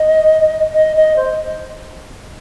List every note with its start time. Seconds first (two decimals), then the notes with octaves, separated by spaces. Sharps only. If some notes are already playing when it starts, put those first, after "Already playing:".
Already playing: D#5
0.74 D#5
0.96 D#5
1.16 C5